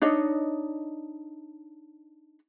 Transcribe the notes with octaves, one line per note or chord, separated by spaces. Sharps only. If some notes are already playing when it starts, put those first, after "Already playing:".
D4 D#4 C#5 D#5